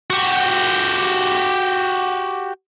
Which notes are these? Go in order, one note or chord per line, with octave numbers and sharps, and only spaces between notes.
F#4 G4